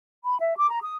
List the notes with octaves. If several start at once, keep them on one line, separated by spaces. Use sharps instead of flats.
B5
E5
D6
A#5
D#6